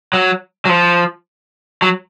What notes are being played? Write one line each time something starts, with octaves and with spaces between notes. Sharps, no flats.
F#3
F#3
F3
F#3